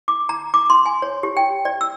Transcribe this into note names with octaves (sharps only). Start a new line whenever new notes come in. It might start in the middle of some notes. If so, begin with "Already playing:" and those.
D6
A#5
D6
C6
G#5
C#5
G4
G5
D5
E6